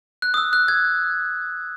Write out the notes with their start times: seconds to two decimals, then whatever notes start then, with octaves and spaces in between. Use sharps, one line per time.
0.22 F#6
0.34 D#6
0.37 E6
0.53 F#6
0.68 G#6